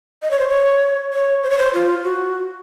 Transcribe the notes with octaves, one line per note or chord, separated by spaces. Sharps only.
D#5
C#5
C5
C#5
C#5
C5
C#5
C5
F4
F#4